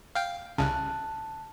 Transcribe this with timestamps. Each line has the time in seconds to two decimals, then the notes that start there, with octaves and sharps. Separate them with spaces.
0.15 F5 G5
0.58 C2 C#3 A5 F6 F#6